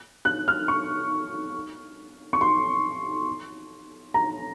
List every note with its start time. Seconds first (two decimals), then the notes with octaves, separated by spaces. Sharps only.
0.25 F#6
0.48 F6
0.68 C#6
2.33 C#6
2.41 C6
4.14 A#5